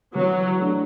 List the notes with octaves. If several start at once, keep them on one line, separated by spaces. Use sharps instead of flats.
E3 F#3
A3 D4